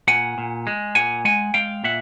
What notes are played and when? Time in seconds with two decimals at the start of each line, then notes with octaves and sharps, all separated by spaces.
0.08 A#2 F#5 G#5
0.38 A#2
0.67 G#3
0.95 A#2 F#5 G#5
1.25 G#3 F#5 G#5
1.54 G#3 F5 G5
1.84 A#2 E5 F#5